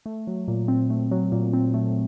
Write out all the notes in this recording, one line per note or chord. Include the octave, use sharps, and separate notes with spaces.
A3
F#3
A#2
C4
A3
F#3
A#2
C4
A3